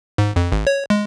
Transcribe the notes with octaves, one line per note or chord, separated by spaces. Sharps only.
G#2
F2
G#1
C#5
G#3